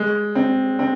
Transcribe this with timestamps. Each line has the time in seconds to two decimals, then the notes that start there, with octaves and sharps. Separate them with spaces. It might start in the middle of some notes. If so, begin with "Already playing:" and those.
Already playing: G#3
0.35 C4
0.79 C4